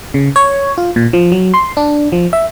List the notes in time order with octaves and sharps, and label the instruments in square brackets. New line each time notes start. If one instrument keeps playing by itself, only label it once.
[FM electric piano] C#3
C#5
F4
A#2
F3
F#3
C6
D4
F3
E5